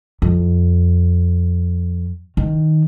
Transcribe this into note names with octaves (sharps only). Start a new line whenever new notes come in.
F2
D#3